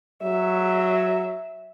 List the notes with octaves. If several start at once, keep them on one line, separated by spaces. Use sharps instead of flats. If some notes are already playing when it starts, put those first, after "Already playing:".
F#3 E5